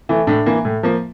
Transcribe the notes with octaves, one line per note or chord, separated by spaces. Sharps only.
E3 A3
A2 D4
E3 A#3
A2
F3 A#3